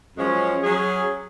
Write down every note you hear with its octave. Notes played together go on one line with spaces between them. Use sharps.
F#2 F3 G#3 C#4
F#3 C#4 G#4